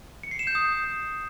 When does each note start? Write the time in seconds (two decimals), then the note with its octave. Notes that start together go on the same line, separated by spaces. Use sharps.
0.23 C#7
0.31 C7
0.39 E7
0.47 G6
0.55 D#6